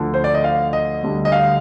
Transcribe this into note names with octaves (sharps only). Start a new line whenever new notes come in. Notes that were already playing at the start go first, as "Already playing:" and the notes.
Already playing: D2 D3 F3
C5
D5
D#5
F5
D#5
D2 D3 G3
D#5
F5